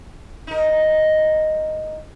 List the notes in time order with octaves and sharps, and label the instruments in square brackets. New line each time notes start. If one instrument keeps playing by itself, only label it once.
[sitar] D#4 A#4